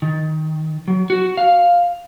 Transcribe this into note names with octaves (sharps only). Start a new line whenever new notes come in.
D#3
F#3
F#4
F5